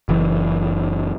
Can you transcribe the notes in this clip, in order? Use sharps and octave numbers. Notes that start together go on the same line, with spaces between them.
F#1 E3